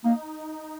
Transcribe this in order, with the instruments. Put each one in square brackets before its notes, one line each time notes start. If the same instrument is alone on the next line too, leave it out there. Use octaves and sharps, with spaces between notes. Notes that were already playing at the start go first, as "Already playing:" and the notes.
[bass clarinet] A#3 [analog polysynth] D#4